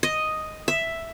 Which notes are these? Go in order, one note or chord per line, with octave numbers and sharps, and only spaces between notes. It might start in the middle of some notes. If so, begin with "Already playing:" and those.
D#5
E5